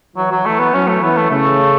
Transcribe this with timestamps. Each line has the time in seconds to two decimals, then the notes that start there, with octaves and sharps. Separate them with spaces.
0.16 E3 F#3
0.31 F#3
0.45 E3 A3
0.59 B3
0.73 F#3 C#4
0.88 A3
1.02 E3 B3
1.17 A3
1.30 C#3 A3